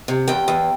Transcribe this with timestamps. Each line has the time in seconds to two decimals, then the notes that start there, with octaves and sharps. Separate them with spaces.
0.08 C3
0.28 E2 G5
0.48 E2